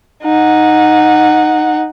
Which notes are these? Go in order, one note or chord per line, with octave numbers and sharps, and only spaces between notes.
D#4 F#5